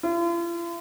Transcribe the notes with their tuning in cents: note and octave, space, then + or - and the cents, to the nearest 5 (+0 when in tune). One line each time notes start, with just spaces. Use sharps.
F4 -45